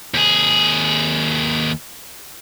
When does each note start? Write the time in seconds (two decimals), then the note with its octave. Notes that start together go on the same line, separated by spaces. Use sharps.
0.14 D#2 G#4